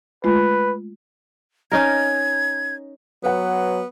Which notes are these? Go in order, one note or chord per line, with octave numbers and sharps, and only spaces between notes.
G#3 A3 F4 B4
C#4 D#4 A#4 G#6
F#3 B3 B4 F#5